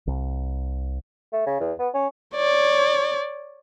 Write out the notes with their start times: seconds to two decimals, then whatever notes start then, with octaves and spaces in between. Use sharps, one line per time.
0.07 C2
1.33 A3
1.46 C#3
1.60 E2
1.79 B3
1.94 C#4
2.35 C#5 D5